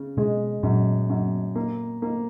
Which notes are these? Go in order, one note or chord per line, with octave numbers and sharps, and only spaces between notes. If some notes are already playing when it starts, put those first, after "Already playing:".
Already playing: C#3
B2 G#3
F#2 A#2
F#2
A#3
A#3